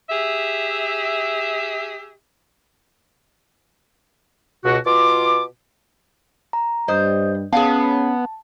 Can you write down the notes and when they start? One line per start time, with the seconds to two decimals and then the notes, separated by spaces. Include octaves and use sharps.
0.09 G4 G#4 E5
4.64 C#2 B2 F#4
4.84 B2 F4 D6
6.53 A#5
6.88 G2 G3 C5 D#5 D#6 G6
7.53 B3 C#4 G#4 F5 A5